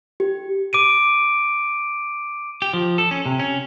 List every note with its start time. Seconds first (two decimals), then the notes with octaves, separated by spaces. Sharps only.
0.20 G4
0.73 D6 D7 D#7
2.62 G4
2.73 F3
2.98 A4
3.11 C#4
3.26 C3
3.40 C#4